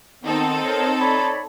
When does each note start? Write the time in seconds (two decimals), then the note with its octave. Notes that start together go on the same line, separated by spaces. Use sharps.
0.24 D#3 B3 C4 D#4 A4
0.64 A#4 C5 C#5
1.01 C#5 D5 B5